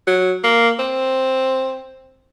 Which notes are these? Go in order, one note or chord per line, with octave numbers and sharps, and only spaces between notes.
F#3
A#3
C4